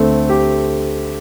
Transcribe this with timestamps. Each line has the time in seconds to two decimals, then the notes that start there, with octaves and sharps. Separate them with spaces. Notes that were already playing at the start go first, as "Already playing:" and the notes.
Already playing: D2 D3 A3 C4
0.29 G4